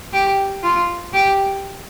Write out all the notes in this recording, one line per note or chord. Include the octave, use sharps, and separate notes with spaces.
G4
F4
G4